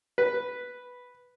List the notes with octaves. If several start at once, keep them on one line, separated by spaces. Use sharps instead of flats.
B4